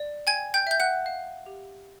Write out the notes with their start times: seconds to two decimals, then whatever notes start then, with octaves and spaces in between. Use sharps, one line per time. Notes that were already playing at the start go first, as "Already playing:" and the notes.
Already playing: D5
0.27 G5 G#5 G#6
0.54 G5 G6
0.67 E5 G6
0.80 F#5 F#6
1.06 F5
1.46 G4